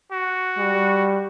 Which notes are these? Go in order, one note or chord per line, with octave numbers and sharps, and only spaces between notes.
F#4
G3